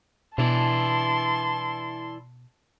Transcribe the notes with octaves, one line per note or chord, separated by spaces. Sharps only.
B2 E3 D4 E4 A5 C6